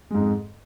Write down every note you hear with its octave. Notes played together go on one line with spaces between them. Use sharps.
F2 G#2 G#3